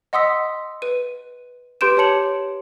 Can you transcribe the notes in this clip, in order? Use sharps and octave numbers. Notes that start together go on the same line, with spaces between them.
D#5 F#5 C6 D#6 E6 B6
B4 D#7
G4 B4 C6 G6 D7 E7
G4 C#5 A5 C#7 F#7